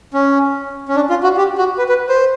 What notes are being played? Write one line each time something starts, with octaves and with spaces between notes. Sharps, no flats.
C#4
C#4
D4
F4
F#4
G4
F#4
B4
B4
C5